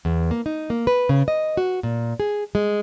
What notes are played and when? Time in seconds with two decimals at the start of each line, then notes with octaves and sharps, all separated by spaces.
0.05 E2
0.31 A#3
0.46 D#4
0.70 A#3
0.87 B4
1.09 C#3
1.28 D#5
1.57 F#4
1.83 A#2
2.20 G#4
2.55 G#3